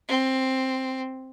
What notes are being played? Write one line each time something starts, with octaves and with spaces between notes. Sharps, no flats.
C4